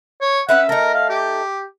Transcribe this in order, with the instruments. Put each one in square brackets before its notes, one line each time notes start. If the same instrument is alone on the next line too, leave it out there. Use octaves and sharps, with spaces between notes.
[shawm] C#5
[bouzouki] C#4 B4 E5 [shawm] F#5
[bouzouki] A3 D#4 [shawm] A#4
[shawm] F5
G4